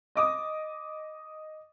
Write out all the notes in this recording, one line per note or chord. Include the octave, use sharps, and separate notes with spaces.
D#5 D6 D#6